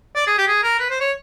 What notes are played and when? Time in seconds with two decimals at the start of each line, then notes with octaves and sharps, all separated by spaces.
0.15 D5
0.27 G#4
0.38 G4
0.47 G#4
0.63 A#4
0.79 B4
0.90 C5
1.00 C#5